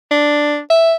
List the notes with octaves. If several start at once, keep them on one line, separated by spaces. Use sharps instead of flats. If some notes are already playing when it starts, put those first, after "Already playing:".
D4
E5